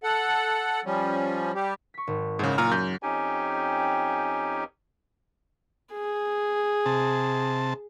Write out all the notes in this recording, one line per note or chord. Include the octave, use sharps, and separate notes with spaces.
A4 F#5
F3 G3 C#4
G3 G4
C#6 B6
G#1
F#1 G#2 C#3 F#5
A#2 A#5 F6
F#2 G6
F2 C#4 D#4 G4 G5 G#5
G#4
C3 A5